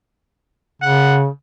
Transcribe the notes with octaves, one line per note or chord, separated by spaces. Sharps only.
C#3 F#5